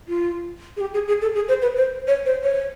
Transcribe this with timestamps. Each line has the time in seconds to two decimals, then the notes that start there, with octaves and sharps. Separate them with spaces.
0.08 F4
0.77 G#4
0.81 G4
0.94 G#4
1.08 G#4
1.22 A4
1.35 G#4
1.48 C5
1.62 B4
1.76 C5
2.08 C#5
2.26 C5
2.43 C#5